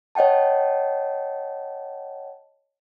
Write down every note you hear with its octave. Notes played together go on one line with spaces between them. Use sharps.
C#5 D#5 F#5 G5 A5